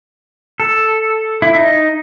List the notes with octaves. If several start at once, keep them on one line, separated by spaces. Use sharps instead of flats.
A4
E4
D#4